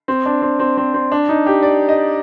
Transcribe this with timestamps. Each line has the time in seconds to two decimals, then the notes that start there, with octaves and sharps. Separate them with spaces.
0.08 C4
0.26 D4
0.42 C4
0.59 C4
0.77 C4
0.94 C4
1.12 D4
1.29 D#4
1.47 G4
1.63 D5
1.89 D#5